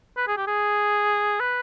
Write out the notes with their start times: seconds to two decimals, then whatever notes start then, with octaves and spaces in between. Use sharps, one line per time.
0.17 B4
0.28 G#4
0.37 G4
0.47 G#4
1.40 B4